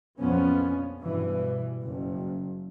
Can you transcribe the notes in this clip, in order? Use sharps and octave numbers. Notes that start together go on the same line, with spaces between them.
A#1 F2 F3 B3 C#4
G2 B2 E3
F#1